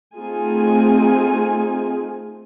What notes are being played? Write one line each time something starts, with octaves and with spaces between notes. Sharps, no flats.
A3 C4 D#4 F4 G#4 G#5